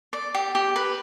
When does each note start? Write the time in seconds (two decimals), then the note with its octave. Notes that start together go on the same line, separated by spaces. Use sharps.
0.13 D5
0.34 G4
0.55 G4
0.76 B4